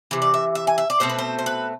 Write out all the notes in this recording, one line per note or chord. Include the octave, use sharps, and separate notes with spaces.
C3 E3
D5
E5
E5
G#5
E5
D5
B2 A3 C4 C5
B4
C5
C5
B4